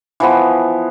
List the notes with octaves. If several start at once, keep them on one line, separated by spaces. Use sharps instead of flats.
E3 F3 B3